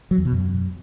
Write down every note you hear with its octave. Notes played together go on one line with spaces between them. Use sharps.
F#3
E2
B2
F#2